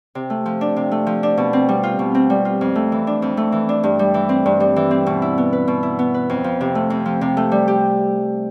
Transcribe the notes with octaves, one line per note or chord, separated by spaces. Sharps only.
C3
A3
F3
D4
C3
A3
F3
D4
B2
C4
G3
F4
B2
C4
G3
F4
F2
A3
E3
D4
F2
A3
E3
D4
G2
G3
E3
C4
G2
G3
E3
C4
B2
E4
B3
B4
B2
E4
B3
B4
F2
F3
C3
A3
F2
F3
C3
A3
G3
G4